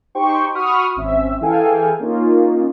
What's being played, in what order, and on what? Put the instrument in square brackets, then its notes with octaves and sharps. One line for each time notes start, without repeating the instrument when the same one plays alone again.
[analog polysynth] D#4 G4 C5 G5 C#6
F#4 B5 C#6 D#6 F6
G#1 C4 C#4 E5
E3 G#4 A4 F5 G5 G#5
A#3 C#4 D#4 F4